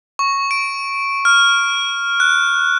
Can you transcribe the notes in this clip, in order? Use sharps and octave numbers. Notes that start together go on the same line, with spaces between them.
C#6
D7
F6
F#6